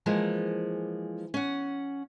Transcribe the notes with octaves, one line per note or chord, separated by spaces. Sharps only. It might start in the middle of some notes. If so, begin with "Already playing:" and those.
E3 F3 G#3 A#3
C#4 F#5